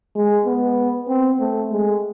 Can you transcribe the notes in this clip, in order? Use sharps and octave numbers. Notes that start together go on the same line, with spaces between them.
G#3
B3
C4
A3
G#3